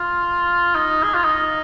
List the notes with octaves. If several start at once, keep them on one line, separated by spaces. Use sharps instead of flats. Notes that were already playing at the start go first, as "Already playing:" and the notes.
Already playing: F4
D#4
G#4
F4
D#4